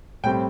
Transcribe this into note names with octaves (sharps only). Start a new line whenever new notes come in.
A2 G3 C4 G5